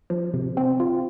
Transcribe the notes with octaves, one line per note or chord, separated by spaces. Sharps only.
F3
C3
C4
F4